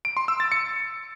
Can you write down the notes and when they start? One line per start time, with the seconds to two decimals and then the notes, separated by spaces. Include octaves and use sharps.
0.05 D7
0.17 C6
0.28 E6
0.40 A6
0.52 C#7